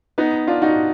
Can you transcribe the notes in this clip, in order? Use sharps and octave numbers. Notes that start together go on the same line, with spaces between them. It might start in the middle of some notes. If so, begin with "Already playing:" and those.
B3 D#4
D4 F4
D#4 F#4